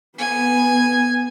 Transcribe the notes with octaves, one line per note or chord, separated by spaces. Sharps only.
B3 G#5